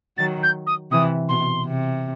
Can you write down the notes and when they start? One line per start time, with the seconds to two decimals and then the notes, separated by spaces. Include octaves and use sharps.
0.17 D#3 F#3 A6
0.43 G6
0.67 D#6
0.91 C3 E3 D#6
1.29 B2 C6
1.66 C3